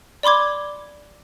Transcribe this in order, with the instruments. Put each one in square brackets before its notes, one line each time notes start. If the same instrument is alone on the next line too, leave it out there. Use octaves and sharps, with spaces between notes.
[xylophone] D5 B5 C6 D6 G#6